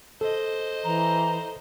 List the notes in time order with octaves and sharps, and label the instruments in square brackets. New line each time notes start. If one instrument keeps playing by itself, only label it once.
[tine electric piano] A4 [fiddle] C5 D#5
[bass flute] E3 [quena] A#5